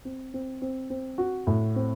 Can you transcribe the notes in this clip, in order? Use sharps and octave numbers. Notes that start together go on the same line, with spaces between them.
C4
C4
C4
C4
F#4
A2
C4